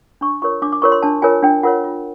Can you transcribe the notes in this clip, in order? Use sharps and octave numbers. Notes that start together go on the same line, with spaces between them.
D4 C#6
F4 A#4 C#5 C#6
D4 D6
D6
F4 A#4 C#5 C#6
C6
D4 A5
F4 A#4 C#5 G#5
D4 G5
F4 A#4 C#5 F#5
F4